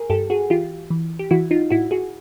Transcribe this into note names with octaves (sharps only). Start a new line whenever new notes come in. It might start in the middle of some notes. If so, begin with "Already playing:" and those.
Already playing: G#4 A#4
G2 G4 A4
F#4 G#4
E3 F4 G4
E3
G4
E3 E4 F#4
D#4 F4
A2 E4 F#4
F#4 G#4